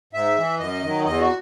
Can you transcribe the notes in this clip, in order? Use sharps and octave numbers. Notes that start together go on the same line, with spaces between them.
G#2 E5
E3
F#2 D#5
D#3 F#3
E2 D#5
F#4